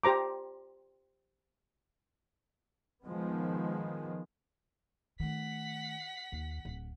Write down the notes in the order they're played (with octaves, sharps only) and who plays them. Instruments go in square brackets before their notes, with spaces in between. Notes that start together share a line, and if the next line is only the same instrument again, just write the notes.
[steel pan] G4 C5 A#5 D6
[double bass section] D#3 F3 G#3 B3
[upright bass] D#3 A3 [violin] F#5 B6
[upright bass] D#2
D1